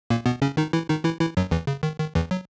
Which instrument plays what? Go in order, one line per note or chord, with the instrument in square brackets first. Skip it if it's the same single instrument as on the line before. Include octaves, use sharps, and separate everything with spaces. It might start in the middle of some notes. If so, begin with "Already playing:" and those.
[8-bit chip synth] A#2 A#3
B2 B3
C#3 C#4
D#3 D#4
E3 E4
D#3 D#4
E3 E4
E3 E4
F#2 F#3
E2 E3
C#3
D#3
D#3
E2 E3
F#3